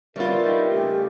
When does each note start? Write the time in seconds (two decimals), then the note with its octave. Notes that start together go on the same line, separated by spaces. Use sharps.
0.16 G2 G3 F4 A#4 B4 C#5 E5 B5
0.44 D#4 E4 G4
0.71 C#3 A3 G4